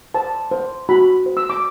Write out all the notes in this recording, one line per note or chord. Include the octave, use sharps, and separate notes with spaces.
C5 A5
C5
F#4 B5
C5
E6
D6